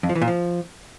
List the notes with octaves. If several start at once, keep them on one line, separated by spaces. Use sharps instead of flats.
F2
F3
E3
A#2
F3